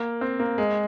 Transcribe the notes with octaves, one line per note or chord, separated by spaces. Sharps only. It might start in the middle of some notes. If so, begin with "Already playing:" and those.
Already playing: A#3
C4
A#3
G#3